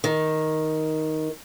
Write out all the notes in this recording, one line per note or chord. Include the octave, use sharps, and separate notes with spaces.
D#3